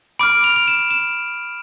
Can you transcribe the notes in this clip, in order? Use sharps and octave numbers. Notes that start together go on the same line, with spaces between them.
B5 D6 F6 D7
F7
F7
E7
E7